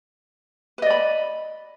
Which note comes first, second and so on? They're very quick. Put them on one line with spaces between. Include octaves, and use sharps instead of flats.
B4 D#5 D5 B5